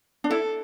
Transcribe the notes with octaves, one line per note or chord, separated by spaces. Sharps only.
D4
E4 A4